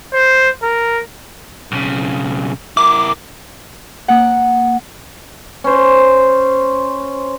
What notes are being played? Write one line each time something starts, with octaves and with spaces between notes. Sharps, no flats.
C5
A#4
B1 C#3
E4 A#4 D6
A#3 F#5
C#4 C5